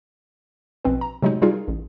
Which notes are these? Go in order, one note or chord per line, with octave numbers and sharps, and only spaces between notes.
A#1 B2 C4 B4
A#5
C3 F#3 G#3 A3 D#4
G3 D#4 F4 G#4 A#4
A1